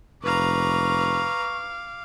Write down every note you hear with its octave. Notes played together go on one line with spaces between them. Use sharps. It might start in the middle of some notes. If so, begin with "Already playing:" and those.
F1 B4 F5 A#5 C#6 D6